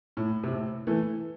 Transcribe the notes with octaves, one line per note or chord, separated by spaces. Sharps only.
A2
C3
A2
E3 A3